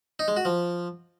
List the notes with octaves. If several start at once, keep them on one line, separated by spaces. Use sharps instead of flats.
D#4
G#3
F#4
F3